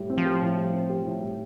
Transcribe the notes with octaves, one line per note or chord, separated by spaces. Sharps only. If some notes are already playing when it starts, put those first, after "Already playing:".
Already playing: A2 G3
C4
F3
G4
A2
G3
C4
G4
A2
G3